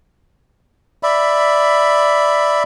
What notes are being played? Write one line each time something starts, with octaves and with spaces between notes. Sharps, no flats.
D5 E5 B5